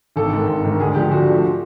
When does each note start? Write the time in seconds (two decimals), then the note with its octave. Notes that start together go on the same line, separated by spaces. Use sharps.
0.16 G#1 A4
0.32 G#2 D#3
0.47 G#1
0.63 G#2 D#3
0.80 D2 G#4
0.95 D3 F3 G4
1.10 D2 F#4
1.27 D3 F3